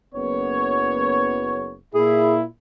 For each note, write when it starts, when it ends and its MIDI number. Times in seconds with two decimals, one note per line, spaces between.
0.15 1.74 30
0.15 1.74 59
0.15 1.74 73
1.95 2.44 46
1.95 2.44 64
1.95 2.36 68